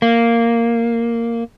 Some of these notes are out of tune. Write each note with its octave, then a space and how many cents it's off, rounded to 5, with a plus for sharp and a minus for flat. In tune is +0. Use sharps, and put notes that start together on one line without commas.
A#3 -5